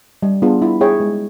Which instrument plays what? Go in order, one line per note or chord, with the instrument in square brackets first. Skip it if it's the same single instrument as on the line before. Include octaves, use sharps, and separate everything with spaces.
[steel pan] G3
B3 D4 F4 G#4
E4
G#4 C#5 E5 G5
G#3